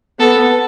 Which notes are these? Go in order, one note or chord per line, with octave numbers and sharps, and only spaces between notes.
B3 A4